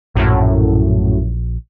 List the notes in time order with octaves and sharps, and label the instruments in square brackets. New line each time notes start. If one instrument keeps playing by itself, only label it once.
[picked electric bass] A#1 [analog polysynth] F#2 A2